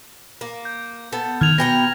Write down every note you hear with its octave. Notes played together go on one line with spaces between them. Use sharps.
A#3
G6
B3 A4
D#3 F6 G#6 F7
B2 B3 G5 A#5 A#6